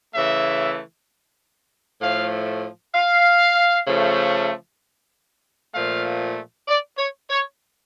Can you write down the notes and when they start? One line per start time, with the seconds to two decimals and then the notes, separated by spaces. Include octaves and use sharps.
0.15 C#3 E3 A3 E5
2.01 A2 F3 A3 F5
2.95 F5
3.87 C#3 F3 A3
5.74 A#2 F3 A3 F5
6.68 D5
6.98 C#5
7.30 C#5